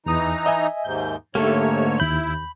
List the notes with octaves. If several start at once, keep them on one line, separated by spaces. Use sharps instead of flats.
E2 E3 D#4 A#5 D#6
D#5 E5 G#5
D#2 G#2 G6
G#2 D3 A3 A#3 G4 A4 C#5 E5
D#2 E4 B5 G6